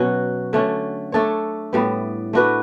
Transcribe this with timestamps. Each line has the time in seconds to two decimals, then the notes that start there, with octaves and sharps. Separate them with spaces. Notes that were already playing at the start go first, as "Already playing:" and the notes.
Already playing: B2 F#3 C#4 F#4
0.53 D3 A3 C#4
1.12 A3 D4 A4 C#5
1.73 A2 G3 B3
2.33 A3 D4 F#4 B4